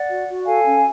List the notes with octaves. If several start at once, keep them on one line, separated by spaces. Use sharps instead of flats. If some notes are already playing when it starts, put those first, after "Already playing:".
Already playing: D5 F#5
F#4
F#4
A4 F5 G#5
C#4